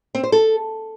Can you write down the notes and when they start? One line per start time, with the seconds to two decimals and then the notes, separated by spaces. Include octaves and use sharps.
0.15 C4
0.23 C5
0.32 A4